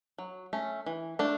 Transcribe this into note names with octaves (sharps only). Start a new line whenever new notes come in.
F#3
A3 C#4
E3
A3 D4